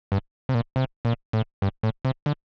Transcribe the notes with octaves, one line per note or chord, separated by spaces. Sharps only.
G2
C3
A#2
C3
A#2
A2
G2
A2
C3
D3